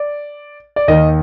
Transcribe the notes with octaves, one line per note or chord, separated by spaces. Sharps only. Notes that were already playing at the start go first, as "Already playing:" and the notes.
Already playing: D5
D5
D#2 D#3 D#5